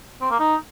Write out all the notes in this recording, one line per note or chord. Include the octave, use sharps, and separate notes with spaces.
C4
A#3
D#4